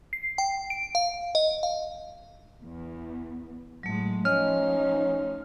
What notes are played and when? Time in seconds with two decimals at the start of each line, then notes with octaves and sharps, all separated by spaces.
0.13 C7
0.38 G5
0.70 D7
0.95 F5
1.35 D#5
1.63 F5
2.62 E2
3.83 A2 F#3 G#3 A3
4.25 F3 A3 C#4 D#4 D#5 F6